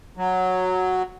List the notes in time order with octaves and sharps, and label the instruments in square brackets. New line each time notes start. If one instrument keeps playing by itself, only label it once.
[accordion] F#3